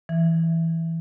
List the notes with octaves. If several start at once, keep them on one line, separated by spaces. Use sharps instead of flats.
E3